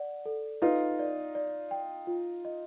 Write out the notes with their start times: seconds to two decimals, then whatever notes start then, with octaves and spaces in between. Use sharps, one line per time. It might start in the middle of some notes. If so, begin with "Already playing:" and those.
Already playing: D5 F#5
0.26 A4
0.62 D#4 F4 B4
0.99 D5
1.35 D5
1.71 G5
2.07 F4
2.45 D#5